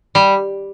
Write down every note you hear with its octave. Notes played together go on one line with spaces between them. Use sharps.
G3